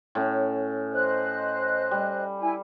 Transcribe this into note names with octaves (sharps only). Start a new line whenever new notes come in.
A2 C#4
C5 D#5 F#6
G3
E4 G#5